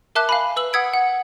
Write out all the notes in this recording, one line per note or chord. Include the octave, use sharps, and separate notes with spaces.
A#4 E5 A5 D6 F#6
F5 G#5 B5
B4 E6 F#7
F#5 D#6 E6 G#6 B6 D7
F#5